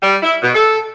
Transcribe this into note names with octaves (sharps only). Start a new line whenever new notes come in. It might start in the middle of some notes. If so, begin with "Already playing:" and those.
G3
E4
B2
A4